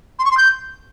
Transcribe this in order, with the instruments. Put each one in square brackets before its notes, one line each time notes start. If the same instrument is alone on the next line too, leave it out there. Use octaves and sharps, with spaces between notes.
[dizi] C6
C#6
C6
G6